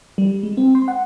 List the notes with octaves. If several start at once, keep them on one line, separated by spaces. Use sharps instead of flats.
G3
G#3
C4
C6
F#5